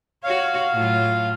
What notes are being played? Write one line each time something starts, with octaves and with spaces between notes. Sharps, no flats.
F#4 C#5 F5
A2 F#3 F4